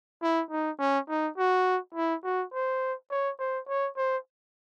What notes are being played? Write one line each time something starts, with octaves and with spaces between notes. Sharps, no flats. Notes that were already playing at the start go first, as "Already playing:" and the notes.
E4
D#4
C#4
D#4
F#4
E4
F#4
C5
C#5
C5
C#5
C5